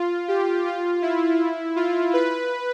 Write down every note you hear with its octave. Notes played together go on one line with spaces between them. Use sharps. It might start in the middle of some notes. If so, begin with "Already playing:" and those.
Already playing: F4
G4
F4
E4
F4
B4